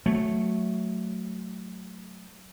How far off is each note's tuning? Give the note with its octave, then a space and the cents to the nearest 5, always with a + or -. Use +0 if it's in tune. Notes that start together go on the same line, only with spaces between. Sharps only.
F#3 +0 A3 +0